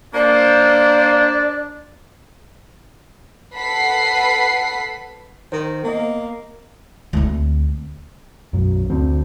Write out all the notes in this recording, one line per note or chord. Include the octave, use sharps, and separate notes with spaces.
A#3 D4 C5 D5
A4 B4 F#5 B5 B6 C7
D#3 C5
A#3 B3 D#5
D2 C4
B1 F#2
D2 C4